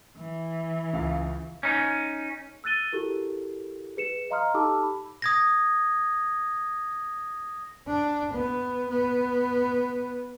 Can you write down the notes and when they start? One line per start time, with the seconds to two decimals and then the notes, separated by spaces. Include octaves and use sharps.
0.18 E3
0.93 C#2 F5
1.63 C#4 D#4
2.64 E6 F#6 A6 D#7 G7
2.93 E4 F#4 G4 A4 A#4
3.96 G#4 B4 C#7 E7
4.30 D#5 F5 A#5 C6 D#6 F6
4.54 D#4 G4 A4 A5 D6 E6
4.83 B5
5.22 D#6 G#6 A#6
7.87 D4
8.33 B3
8.90 B3